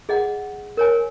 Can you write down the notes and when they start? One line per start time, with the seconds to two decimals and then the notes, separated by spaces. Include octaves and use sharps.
0.09 G#4 D#5 F#5
0.77 A#4 C#5 G#5